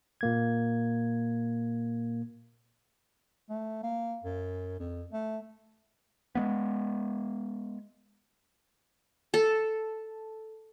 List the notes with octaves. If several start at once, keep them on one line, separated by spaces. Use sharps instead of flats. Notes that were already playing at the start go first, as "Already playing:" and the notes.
A#2 A#3 G#6
A3
A#3
F#2
F2
A3
G#3 A#3 B3
A4